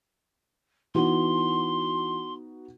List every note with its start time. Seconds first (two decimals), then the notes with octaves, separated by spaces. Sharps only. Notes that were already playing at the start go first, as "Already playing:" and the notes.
0.95 E3 B3 D#4 F#4 C6